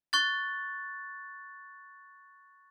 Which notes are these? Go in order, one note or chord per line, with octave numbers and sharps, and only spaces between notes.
C#6 F#6 A6